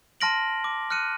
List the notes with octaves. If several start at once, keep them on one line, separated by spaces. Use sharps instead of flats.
A5 C6 F6 A#6 D7 F#7
D6
F6 F#6 C#7 D#7